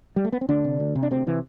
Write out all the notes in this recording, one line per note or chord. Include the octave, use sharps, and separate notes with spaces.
G3
A3
B3
C4
D2 D3 D4
C3
D2
C3
D4
D2 C3 C4
C3 E3